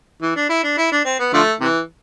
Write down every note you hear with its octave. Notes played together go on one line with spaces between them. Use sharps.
E3
D4
E4
D4
E4
D4
C4
B3
D3 F3 A3
C3 E3